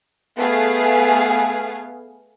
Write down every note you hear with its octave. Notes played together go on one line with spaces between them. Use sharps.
A3 B3 G#4 F5